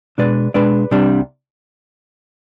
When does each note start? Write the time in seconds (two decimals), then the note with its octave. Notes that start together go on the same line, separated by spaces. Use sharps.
0.18 B2 G#3 D4 B4 D5
0.54 B2 G#3 D4 B4 D5
0.91 C2 C3 G3 D4